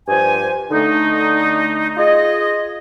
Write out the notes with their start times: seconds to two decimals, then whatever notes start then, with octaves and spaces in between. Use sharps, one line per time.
0.08 G2 F3 C5 G#5
0.71 D3 A3 D#4
1.97 F4 G#4 D#5